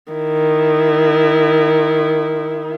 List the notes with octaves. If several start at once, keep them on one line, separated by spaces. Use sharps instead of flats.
D#3 E4